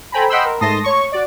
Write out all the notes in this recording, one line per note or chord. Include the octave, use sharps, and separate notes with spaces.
A4 C5 G5 G#5 A#5 B5
D#5 F#5 G5 B5 C6 E6
A#4
G#2 A3 A5 C6 D#6 A#6
C#5 C#6
F#4 D5